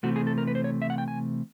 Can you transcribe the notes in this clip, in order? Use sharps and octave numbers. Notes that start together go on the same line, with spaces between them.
C3 E3 A3 F#4
G#4
A4
A#4
B4
C5
C#5
E5
F#5
G5
G#5